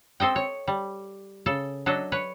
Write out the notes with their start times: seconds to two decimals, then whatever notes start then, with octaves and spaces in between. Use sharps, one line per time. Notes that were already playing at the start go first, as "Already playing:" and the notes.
0.20 C4 A4 D#5 G5
0.36 C#5
0.67 G3
1.46 C#3 A4 A5
1.86 F#3 D4 A4 D#5
2.12 B4 C#5